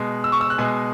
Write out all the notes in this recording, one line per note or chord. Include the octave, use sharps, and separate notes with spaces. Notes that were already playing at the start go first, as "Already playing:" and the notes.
Already playing: B2 G#3
E6
C#6
E6
F#6
B2 G#3 G#5